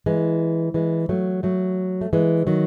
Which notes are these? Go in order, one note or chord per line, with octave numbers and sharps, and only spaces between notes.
E3 G#3
E3 G#3
F#3 A3
F#3 A3
A3
E3 G#3
D#3 F#3